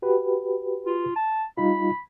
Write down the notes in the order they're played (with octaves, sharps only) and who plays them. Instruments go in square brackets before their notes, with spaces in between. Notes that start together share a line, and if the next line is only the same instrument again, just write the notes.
[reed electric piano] F#4 G4 B4
[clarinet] F4
A5
[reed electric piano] G3 D#4 F4 [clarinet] B5